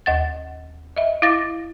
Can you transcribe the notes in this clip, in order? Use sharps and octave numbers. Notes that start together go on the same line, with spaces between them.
D#2 F#5 A6
D#5 E5
E4 F5 D6 A6 A#6